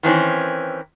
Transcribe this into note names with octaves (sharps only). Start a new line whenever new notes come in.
D#3 E3 C4 C#4